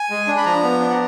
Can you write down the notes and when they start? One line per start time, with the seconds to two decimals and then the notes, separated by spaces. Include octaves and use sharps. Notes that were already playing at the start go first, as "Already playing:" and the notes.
Already playing: G#5
0.10 G#3
0.28 D4
0.37 B5
0.46 F3 A#5
0.63 B3
0.80 D4
0.90 F#5